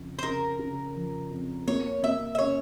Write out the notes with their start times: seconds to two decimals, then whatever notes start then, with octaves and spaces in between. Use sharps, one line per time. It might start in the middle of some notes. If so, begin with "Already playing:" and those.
Already playing: F2 C#3 F3
0.19 C5
0.23 C#3 A#4
0.59 C#3
0.95 F3
1.30 F2
1.67 A#3 C#5
2.03 A#3 E5
2.35 E5
2.39 C#4 C#5